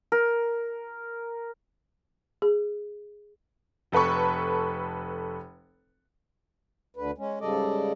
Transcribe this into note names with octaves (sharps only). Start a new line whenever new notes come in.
A#4
G#4
F1 A4 B4 B5 C#6
D2 D3 B4
G#3 C#4
G#2 C#3 G3 A4 D5 D#5